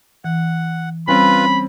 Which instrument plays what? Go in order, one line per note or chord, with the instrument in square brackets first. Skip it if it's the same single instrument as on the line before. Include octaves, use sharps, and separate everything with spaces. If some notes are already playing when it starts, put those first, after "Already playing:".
[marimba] E3 [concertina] F#5
[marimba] G3 [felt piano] C4 C#4 [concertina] F4 B4 [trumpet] B5